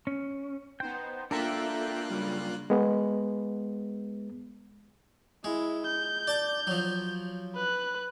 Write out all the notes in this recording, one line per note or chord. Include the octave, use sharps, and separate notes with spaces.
C#4
B3 D#4 C5 G5
A#3 D4 F4 A4 A#4 E5 G5 F#6
C#3 F#3 G3
G#3 B3
G#3 E4
G6
D5 A5
F3 F#3
B4 F#6